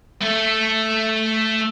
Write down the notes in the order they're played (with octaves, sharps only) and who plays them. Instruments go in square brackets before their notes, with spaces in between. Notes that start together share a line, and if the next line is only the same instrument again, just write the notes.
[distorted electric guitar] A3 A4